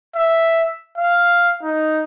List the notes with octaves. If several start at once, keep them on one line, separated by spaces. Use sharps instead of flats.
E5
F5
D#4